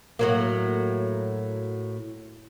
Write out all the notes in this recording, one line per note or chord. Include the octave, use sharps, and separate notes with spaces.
A2 F#3 A#3